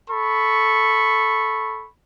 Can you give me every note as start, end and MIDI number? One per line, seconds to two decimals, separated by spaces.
0.10 1.88 69
0.10 1.88 83
0.10 1.88 85